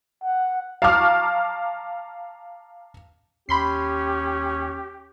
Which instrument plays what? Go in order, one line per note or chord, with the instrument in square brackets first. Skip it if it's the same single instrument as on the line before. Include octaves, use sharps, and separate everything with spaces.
[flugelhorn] F#5
[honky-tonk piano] F5 A5 A#5 C#6 D6 F6
[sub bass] D#2 [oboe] C#4 [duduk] G4 [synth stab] B5 C6 C7